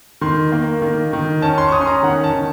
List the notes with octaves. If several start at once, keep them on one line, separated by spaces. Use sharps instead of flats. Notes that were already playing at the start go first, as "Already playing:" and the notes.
D#3 C6
A#3
D#3
D#3
C#4 A5
C6
C#6
C#4 D#6
C6
A#5
D#3 F#5
A5
D#3